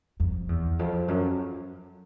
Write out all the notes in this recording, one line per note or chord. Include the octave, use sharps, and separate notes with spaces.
F2
E2
F2
F#2